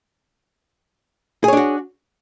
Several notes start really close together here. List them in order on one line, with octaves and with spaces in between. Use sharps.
G#4 C#5 D4 F#4